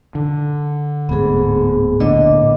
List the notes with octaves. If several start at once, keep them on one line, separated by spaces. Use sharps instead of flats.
D3
D1 G#2 B3 G#4
A#1 A2 D3 D#5 D6